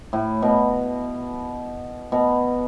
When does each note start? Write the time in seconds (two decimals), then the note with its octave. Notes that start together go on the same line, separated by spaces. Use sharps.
0.13 A2
0.42 B2
2.12 B2